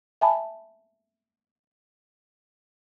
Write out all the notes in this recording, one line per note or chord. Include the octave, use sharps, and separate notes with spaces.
E5 G#5 A5 B5